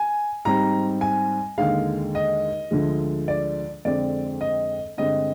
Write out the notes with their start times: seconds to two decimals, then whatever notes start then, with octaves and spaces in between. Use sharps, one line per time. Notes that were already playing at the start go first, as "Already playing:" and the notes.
Already playing: G#5
0.45 G#2 G3 C4 A#5
1.01 G#5
1.58 D#2 D3 G#3 F5
2.15 D#5
2.71 D2 D3 F3 G#3
3.28 D5
3.85 F2 D3 G#3 C4 D5
4.41 D#5
4.97 G2 D3 G#3 C4 D#5